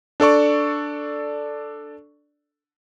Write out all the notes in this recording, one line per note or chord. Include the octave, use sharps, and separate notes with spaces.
D4 A4 D5 C#6